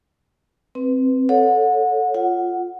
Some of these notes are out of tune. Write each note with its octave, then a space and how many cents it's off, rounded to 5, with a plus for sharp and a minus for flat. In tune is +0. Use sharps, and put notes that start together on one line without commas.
C4 +0 B4 +0
A4 +0 C#5 +0 F#5 -30
F4 +0 F#5 +0